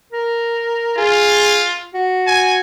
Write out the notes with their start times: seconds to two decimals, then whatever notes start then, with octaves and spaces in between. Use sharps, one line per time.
0.12 A#4
0.97 F4 G#4
1.94 F#4
2.27 G#5